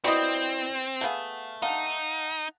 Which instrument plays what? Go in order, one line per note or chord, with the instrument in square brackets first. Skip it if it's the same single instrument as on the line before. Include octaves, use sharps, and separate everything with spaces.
[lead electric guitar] C4 [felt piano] E4 D5 [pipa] F#4 B4 D#5
[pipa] A3 B3 G#4 [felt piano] F5 F#5
[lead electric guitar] D#4 [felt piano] F5 F#5 A5